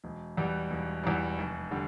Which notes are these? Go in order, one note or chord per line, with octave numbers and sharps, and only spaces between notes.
E1
E2 E3 G3
E1
E2 E3 G3
F1
D3 G3